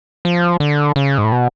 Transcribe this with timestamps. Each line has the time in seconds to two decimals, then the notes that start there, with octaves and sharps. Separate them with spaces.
0.25 F3
0.60 D3
0.96 C#3
1.18 G#2
1.24 A2
1.32 B2